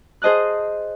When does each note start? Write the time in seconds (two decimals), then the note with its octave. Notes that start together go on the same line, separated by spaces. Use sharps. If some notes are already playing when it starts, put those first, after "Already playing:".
0.22 G#4 C5 D#5 A5 F#6